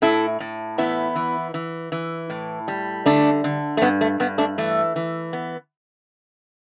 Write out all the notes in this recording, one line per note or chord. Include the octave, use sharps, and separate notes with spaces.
A2 E4 A4
A2
E2 B3 E4
E3
E3
E3
A2
G3
D3 A3 D4
D3
A3
G2 B3
A3
G2 B3
A3 D4
E3 A3
E3
B3